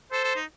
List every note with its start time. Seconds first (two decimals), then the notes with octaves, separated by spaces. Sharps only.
0.11 A4 C5
0.24 A4
0.36 D#4